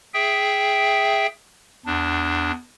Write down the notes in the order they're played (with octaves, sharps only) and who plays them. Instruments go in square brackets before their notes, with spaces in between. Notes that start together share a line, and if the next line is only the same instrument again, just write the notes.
[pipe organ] G#4 E5 G5
E2 D4